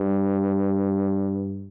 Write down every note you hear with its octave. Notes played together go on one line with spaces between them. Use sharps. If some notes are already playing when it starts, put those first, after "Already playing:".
Already playing: G2